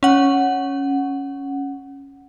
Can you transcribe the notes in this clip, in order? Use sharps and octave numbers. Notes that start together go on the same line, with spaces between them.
C#4 F#5